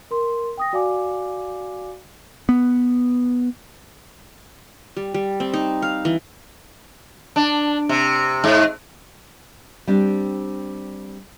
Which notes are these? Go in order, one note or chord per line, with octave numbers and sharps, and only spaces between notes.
A#4 C6
G5 D#6 A#6
F#4 D5 F5 G#5 D6
B3
G3
G3
C4
D#4
F5
E3
D4
C3
G#2
G3 C4 D4